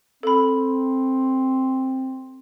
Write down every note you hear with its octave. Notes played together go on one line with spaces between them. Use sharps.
C4 A4 B5